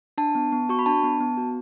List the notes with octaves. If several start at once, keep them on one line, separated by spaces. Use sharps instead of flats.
D4 A5
B3
B3
F#4 C#6
B5
D4 A5
B3
B3
F#4